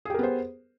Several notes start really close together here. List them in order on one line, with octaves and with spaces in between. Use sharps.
G#4 G4 A#4 B3 C5